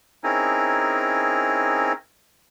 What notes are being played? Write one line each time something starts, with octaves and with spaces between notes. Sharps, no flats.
C4 C#4 D#4 E4 G#4 A#4